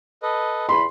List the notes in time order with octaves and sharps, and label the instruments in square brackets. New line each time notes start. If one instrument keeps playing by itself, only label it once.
[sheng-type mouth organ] A4 B4 D#5
[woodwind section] E2 B5 [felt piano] C6